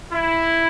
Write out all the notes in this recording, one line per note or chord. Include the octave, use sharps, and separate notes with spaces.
E4